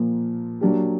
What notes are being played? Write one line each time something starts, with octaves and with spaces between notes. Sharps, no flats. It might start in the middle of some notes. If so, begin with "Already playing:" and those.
Already playing: A#2 F3 A#3
F#3 A#3 D4 G4